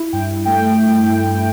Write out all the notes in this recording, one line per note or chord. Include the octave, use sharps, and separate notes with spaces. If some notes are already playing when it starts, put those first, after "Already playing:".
Already playing: E4
G2 G5
A3 G5